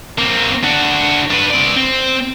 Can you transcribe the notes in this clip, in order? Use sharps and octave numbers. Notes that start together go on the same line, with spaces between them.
A#3 C4
D4 F#4
D4 B4
C4 D5
C4